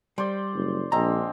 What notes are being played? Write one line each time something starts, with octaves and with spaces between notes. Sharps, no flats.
G3 C5 D5
F#1
A#1 D3 G#3 C4 A#5